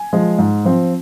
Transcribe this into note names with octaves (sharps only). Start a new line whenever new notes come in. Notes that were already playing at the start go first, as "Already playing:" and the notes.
Already playing: G#5
F3 G#3
G#2
F3 C4